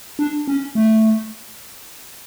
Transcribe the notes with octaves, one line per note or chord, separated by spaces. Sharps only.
D4
C#4
A3